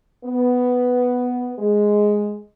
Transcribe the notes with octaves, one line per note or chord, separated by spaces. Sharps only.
B3
G#3